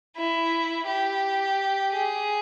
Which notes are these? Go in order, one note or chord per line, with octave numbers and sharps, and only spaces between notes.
E4
G4
G#4